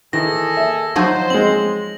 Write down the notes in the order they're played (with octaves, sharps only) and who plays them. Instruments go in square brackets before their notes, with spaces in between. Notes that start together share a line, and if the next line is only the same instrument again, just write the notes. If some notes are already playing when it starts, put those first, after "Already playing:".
[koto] D#3 [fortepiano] E3 [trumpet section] G#4 A4 [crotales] A#6
[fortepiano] E5
[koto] F3 F#3 D#4 [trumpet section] C5
[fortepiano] G#3 C4 [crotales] F#7